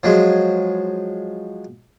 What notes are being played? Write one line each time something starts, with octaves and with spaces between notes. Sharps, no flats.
F3 F#3 G#3